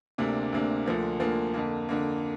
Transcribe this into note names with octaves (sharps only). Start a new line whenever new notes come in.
D2 C3 A#3 D4
D2 C3 A#3 D4
D2 D3 F3 A#3
D2 D3 F3 A#3
F2 D3 A#3
F2 D3 A#3